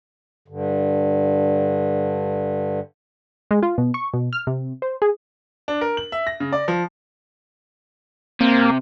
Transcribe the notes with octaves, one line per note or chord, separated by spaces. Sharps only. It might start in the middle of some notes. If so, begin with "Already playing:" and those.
G2 D3
G#3
F4
B2
C#6
B2
F6
C3
C5
G#4
D4
A#4
F#7
E5
A#6
C#3
D5
F3
C3 A#3